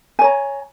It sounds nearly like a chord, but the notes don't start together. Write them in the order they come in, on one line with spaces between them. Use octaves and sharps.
G#5 C#5 A#5